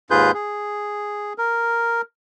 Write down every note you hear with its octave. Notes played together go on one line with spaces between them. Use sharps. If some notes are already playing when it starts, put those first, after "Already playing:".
D#2 G#2 F4 G#4 B4 G6
G#4
A#4